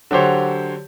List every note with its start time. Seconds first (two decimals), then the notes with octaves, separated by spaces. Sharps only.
0.11 D3 F#3 G4 C5 C#5